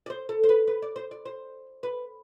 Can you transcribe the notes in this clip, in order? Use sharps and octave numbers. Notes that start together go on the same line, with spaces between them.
D5
C5
A4
C5
B4
B4
D5
C5
D5
C5
B4